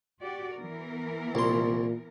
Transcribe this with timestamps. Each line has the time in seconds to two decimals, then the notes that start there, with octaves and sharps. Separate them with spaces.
0.22 F#4 G4 D5
0.56 E3 B3 A#4
1.35 C2 A#2 C6